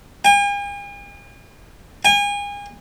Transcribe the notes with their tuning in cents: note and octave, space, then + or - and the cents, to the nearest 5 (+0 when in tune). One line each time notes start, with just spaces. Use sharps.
G#5 -45
G#5 -35